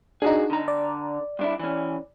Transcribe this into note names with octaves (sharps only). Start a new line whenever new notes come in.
D4 D#4 F#4 G#4
D3 A#5
D5
G2 D4 E4
E3 C#4